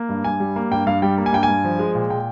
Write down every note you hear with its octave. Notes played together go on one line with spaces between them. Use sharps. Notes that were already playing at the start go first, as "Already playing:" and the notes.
Already playing: A#3
G2
G2 G#5
G3
A#3
G2 G5
G2 F5
G3 G5
A#3
G#5
G2 G5
G2 G#5
F3
G#3
A#2
A#2 G5